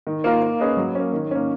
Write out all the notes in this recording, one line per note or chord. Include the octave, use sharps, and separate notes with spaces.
D#3
A#3 F4 A#4
A#3
C#4 G#4 B4 D#5
F#3
A#3 C#4
D#3
A#3 C#4